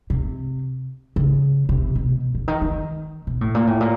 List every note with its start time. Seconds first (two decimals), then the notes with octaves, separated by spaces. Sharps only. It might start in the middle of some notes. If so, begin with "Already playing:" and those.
0.10 C3
1.16 C#3
1.69 C3
1.95 B2
2.35 D3
2.48 D#3
2.62 D#3
3.27 B2
3.41 A2
3.55 A#2
3.67 A2
3.80 A#2